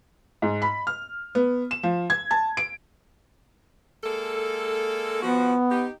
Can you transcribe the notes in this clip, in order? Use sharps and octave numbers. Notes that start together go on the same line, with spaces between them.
G#2
B5
F6
B3
E7
F3
G#6
A5
D7
G#3 A#3 A4
F3 B3 F#4
D#4 G4